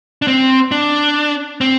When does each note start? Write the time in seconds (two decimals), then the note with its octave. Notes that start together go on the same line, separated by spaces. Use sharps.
0.22 D4
0.28 C4
0.71 D4
1.61 C4